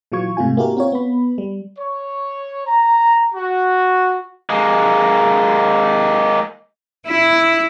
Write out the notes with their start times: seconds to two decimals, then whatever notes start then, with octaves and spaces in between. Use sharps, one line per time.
0.12 A#2 E3 F#3 F4 C#6 G#6
0.37 G#2 C3 A3 F4 G#5
0.57 A#3 E4 F#4 G4 A#4
0.77 C4 F4 C#5
0.92 B3 B5
1.38 G3
1.78 C#5
2.67 A#5
3.34 F#4
4.50 G#3 A#3
7.08 E4